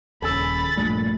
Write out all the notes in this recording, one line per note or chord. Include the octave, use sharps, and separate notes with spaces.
D#1 C#3 A4 G#5 B5 E6 A6
A#1 G2 A#2 A3 D4